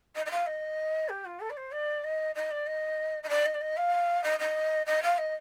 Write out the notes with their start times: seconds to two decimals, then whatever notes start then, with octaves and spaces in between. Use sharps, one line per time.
0.15 D#5
0.26 D#5
0.31 F5
0.46 D#5
1.09 G4
1.25 F4
1.40 A4
1.50 D5
1.57 C5
1.72 D5
2.04 D#5
2.35 D#5
2.51 D5
2.66 D#5
3.23 D#5
3.29 D5
3.46 D#5
3.54 D5
3.61 D#5
3.77 F5
4.24 D#5
4.39 D#5
4.86 D#5
5.02 F5
5.18 D#5